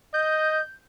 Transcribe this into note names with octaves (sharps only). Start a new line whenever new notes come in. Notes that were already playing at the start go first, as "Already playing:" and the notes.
D#5 G6